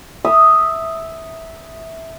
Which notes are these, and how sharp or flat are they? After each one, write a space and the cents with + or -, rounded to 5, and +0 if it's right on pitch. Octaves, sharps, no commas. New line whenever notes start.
E5 -10 A#5 -20 D#6 +0